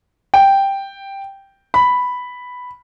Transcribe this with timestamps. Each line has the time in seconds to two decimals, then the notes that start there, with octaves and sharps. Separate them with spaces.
0.34 G5
1.74 B5